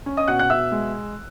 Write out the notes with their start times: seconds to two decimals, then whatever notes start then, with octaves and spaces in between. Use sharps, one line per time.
0.06 C#4
0.17 D#5 D#6
0.28 B2 F#5 F#6
0.39 F#5 F#6
0.50 B2 E5 E6
0.72 G#3